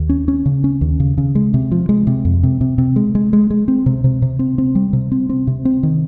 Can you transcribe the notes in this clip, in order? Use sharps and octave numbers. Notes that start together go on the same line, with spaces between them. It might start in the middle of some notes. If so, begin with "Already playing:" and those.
Already playing: D#2
C#4
C#4
C#3
C#4
D#2
C#3
C#3
G#3
C3
F3
G#3
C3
F2
C3
C3
C3
G#3
G#3
G#3
G#3
C4
C3
C3
C3
C4
C4
G3
C3
C4
C4
C3
C4
D#3